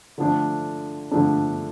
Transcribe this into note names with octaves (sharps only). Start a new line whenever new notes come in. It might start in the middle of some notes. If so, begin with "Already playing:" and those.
D3 F3 A3 D4
D3 F3 A3 D4